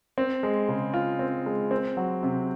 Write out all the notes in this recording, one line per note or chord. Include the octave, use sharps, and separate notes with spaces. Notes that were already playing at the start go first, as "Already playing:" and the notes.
C4
G#3
C#3
F4
C4
G#3
C4
F#3
C3